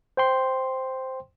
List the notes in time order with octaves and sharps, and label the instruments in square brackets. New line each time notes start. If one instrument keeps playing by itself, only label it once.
[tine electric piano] C5 G5 C6